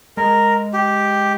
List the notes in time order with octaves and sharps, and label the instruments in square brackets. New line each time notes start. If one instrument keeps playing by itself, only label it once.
[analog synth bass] G#3 [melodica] A#4
[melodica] G4